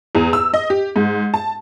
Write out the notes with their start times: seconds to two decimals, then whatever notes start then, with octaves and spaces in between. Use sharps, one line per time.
0.15 E2
0.33 E6
0.54 D#5
0.70 G4
0.96 G#2
1.34 A5